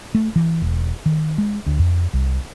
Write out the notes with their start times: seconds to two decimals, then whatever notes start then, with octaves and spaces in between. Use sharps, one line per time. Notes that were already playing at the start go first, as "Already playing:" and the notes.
0.15 A3
0.36 E3
0.62 E1
1.06 D#3
1.38 G#3
1.66 D2
1.79 F2
2.13 C2